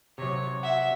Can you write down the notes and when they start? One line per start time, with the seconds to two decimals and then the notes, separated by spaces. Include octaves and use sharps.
0.18 C3 F#3 C#5
0.63 E5 F#5